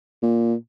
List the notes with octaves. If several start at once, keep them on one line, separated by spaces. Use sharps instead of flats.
A#2